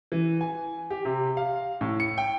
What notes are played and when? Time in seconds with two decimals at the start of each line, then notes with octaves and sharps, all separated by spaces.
0.12 E3
0.41 G#5
0.90 G4
1.05 C3
1.37 F5
1.81 A2
2.00 C#7
2.18 G5